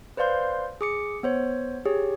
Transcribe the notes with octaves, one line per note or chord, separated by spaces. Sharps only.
B4 C5 D5 F5 C6 G6
G#4 D6 C#7
B3 C5 C#5
G4 G#4 C#5